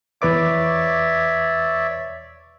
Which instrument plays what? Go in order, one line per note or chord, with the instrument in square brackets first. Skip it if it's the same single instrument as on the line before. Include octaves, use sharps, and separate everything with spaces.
[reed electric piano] E2 B4 D6 [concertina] C#5 D5 E5